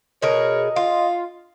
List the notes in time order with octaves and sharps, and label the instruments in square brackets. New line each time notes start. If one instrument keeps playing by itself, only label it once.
[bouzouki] B2 G#4 A#4 [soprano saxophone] C#5 [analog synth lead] D#5
[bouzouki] F4 [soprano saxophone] F5